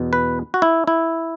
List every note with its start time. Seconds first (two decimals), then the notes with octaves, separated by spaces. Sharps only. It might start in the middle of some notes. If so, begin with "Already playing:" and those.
Already playing: E2 B2
0.13 B4
0.54 F#4
0.62 E4
0.87 E4